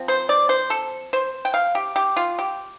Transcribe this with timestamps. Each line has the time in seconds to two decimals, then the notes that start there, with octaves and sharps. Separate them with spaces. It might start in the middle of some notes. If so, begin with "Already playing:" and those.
Already playing: F3 C4
0.08 C5
0.29 D5
0.49 C5
0.70 A4
1.13 C5
1.45 G5
1.54 F5
1.75 G4
1.96 G4
2.16 F4
2.39 G4